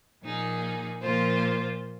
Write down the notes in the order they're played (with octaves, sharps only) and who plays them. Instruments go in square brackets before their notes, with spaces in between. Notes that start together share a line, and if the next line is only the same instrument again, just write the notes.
[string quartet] A#2 F3 A#3 D#4 G#4
A#2 F3 A#3 F4 C5